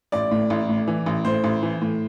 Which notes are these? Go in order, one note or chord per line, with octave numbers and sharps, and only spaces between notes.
A1 D5
A2
A1
A2
E3
A1
A2 C5
A1
E3
A2